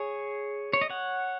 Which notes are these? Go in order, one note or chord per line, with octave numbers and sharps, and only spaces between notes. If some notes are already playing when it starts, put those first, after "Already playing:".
Already playing: G#4 C#5
C#5
D#5
C#5 F#5